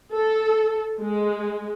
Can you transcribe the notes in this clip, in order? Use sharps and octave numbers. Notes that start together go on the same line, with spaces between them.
A4
G#3